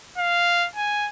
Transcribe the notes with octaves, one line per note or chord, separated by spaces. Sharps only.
F5
G#5